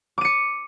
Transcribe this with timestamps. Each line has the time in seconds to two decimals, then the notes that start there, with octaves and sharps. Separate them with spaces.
0.18 D6
0.21 D#7
0.25 C#7